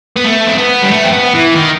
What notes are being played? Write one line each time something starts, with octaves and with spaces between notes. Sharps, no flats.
B3
A3
C4
B3
G3
A3
C4
B3
E3
D#3